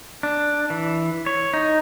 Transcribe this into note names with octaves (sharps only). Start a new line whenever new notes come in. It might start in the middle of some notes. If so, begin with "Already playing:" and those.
D4
E3
C#5
D#4